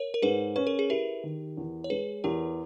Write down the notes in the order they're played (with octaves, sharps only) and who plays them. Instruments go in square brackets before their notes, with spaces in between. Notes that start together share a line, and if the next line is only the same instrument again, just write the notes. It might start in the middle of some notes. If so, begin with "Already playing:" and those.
Already playing: [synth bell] A#4 C#5
A#4
[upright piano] G#2 [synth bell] G#4 B4
[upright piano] C#4 [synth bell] B4
[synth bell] A#4
G#4
[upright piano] E4 [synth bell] G4 A#4
[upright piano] D#3
E2
[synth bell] C#5
[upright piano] G#3 [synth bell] G#4 B4
[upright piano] E2 [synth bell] G4 A#4